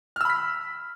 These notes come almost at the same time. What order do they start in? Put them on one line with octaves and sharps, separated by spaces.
F6 E6 B5 B6